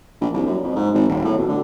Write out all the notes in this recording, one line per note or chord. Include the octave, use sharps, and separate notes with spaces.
A#1
C2
F#2
F2
G#2
G#1
D#1
A2
B2
D3